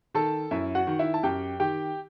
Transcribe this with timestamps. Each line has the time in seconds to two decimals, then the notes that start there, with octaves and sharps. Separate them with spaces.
0.15 D#3 A4 A5
0.51 F#2 E4 E5
0.75 F#4 F#5
0.87 D#3
0.99 E4 E5
1.14 A5
1.23 F#2 G4 G5
1.60 D#3 G4 G5